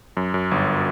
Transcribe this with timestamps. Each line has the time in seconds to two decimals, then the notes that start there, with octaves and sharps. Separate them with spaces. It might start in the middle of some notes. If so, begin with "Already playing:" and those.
0.17 F#2
0.34 F#2
0.51 G1